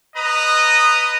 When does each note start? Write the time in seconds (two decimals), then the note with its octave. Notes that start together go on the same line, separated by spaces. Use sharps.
0.16 B4 D#5 A#5 D#6